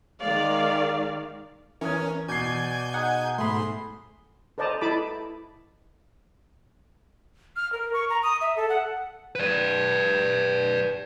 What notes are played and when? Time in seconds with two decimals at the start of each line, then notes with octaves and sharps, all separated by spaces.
0.19 D#3 G#3 D5 F5
1.81 E3 C#4 A#4 D#6 G#6
2.28 B2 D5 G#5 G6 G#6 C7
2.94 D#4 G#4 F#5
3.38 G#2 A3 G#4 B5 C6
4.58 A4 C5 D5 D#5 A5 A#5
4.81 E4 A4 D#5 A5 B5 D6
7.56 F6
7.73 A#4
7.93 C#6
8.10 A#5
8.23 D#6
8.41 E5
8.56 A4
8.69 F#5
9.35 B4 D5